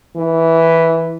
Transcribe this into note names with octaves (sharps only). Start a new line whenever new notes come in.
E3